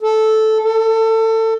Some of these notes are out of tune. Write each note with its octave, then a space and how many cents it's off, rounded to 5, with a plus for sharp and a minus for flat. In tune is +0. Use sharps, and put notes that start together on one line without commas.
A4 -10
A4 +25